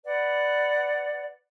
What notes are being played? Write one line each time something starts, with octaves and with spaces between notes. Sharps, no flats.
B4 D5 F#5